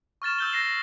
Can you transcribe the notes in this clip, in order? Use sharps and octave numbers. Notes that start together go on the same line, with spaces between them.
C#6 F6 A6 E7
E6 G6 G7
A#6 C7 E7